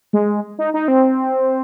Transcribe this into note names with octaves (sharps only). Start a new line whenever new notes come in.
G#3
D#4
D#4
C4